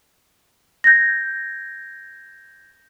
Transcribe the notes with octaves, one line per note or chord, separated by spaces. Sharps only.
G6 G#6 A#6